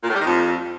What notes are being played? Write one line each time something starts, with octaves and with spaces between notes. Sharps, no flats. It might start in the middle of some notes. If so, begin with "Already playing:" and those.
A#2
A2
G3
D#3
F2